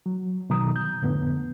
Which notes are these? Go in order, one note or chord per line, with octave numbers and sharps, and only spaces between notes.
F#3
B2 D#3 F#3 A#5 D#6
G6
F2 A2 D3 B3